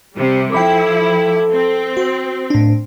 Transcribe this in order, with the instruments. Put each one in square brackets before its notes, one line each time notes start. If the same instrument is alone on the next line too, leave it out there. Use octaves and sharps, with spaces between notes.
[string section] C3 G3
[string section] F3 E4 [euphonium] A4 [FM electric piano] G5 B5 D6
[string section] C4
[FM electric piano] F#4
A2 D4